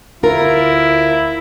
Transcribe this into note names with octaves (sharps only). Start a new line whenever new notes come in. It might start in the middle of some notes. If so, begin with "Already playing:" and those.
D2 E4 F4 A#4